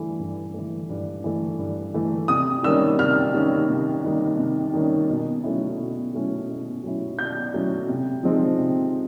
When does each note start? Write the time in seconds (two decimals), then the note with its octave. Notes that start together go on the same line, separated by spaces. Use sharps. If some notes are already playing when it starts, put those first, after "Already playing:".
Already playing: G2 E3 A3
0.19 G2
0.54 E3 A3
0.89 G2
1.24 E3 A3
1.59 G2
1.94 E3 A3
2.28 C3 D#6
2.63 D#3 G3 A#3 C#4 E6
2.99 C3 F6
3.34 D#3 G3 A#3 C#4
3.69 C3
4.04 D#3 G3 A#3 C#4
4.39 C3
4.74 D#3 G3 A#3 C#4
5.09 B2
5.44 F#3 A3 C#4 E4
5.79 B2
6.14 F#3 A3 C#4 E4
6.49 B2
6.83 F#3 A3 C#4 E4
7.18 B2 G6
7.54 F#3 A3 C#4 E4
7.89 C3
8.23 F3 G#3 C4 D#4
8.58 C3